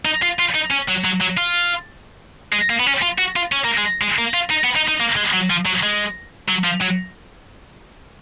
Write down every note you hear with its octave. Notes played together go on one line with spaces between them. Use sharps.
D#4
F4
F4
D#4
C#4
F#3
F#3
F#3
F4
G#3
A#3
B3
C#4
F4
F#4
F4
C#4
A#3
G#3
G#3
A#3
F4
D#4
B3
D#4
D#4
A#3
G#3
F#3
F3
F#3
G#3
F#3
F3
F#3